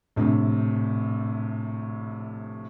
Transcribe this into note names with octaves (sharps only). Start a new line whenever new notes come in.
A#1 A2 C3